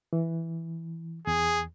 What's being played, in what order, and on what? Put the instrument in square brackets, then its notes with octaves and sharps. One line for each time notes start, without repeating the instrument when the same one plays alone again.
[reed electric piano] E3
[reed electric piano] E2 [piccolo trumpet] G#4